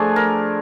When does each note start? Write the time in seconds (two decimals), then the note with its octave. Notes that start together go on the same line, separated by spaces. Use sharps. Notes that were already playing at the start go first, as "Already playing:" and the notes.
Already playing: F3 A3 D4 G#4
0.16 A#4